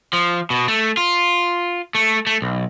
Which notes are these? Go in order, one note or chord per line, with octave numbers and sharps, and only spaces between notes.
F3
B2
A3
F4
A3
A3
B1